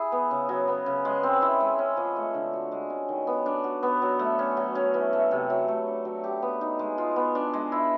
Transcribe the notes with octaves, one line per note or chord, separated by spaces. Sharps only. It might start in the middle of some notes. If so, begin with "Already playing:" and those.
Already playing: E4 G#4
B3
C#3
F#3
B3
C#3
G#3
C4
E4
G#3
C#4
F3
A3
D3
F#4
G#3
C#4
D#3
B3
D4
F#4
B3
F#3
A3
C#4
F#3
C#4
E3
A3
C3
F#3
A3
D4
F#3
G4
B3
D#4
G#3
F4
B3
D4
G#3
E4